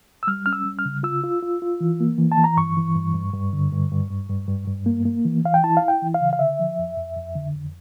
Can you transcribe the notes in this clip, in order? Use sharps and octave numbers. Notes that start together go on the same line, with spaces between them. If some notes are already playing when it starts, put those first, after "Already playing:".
E6
G3 F6
C#4 F6
E6
G3
F6
C#3
F4 E6
F4
F4
F4
E3
A#3
E3
A5
E3
A#5
G2 C#6
E3
G2
G2
G2
D3
G2
G2
G2
G2
G2
G2
A#3
A#3
E3
E3 F5
G5
E4 A5
F5
E4
G5
E3
F5
C#3
F5
D3 E5
F3
F2
F2
F2
D3
F2